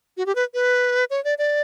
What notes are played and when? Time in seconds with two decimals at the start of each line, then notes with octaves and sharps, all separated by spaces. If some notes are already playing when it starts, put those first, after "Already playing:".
0.17 F#4
0.26 G4
0.35 B4
0.54 B4
1.10 C#5
1.24 D5
1.38 D5